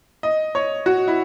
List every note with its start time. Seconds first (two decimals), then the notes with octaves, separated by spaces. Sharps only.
0.23 D#5
0.55 C#5
0.86 F#4
1.08 E4